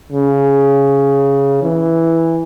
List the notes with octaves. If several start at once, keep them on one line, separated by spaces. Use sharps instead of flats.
C#3
E3